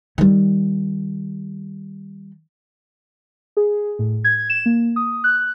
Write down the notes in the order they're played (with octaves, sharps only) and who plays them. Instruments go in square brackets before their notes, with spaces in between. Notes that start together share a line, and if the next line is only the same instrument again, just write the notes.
[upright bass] D#3 G3
[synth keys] G#4
A2
G#6
E7
A#3
D#6
F#6